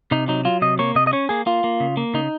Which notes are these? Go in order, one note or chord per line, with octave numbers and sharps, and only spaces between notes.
C3 D#4
F#3 D#4
F#3 F4
C3 D#5
A#3 C#5
C3 D#5
D#5
C#4 C#5
A#3 G#4
A#3 F4
A#3
C#3
A#3
C#3 D#4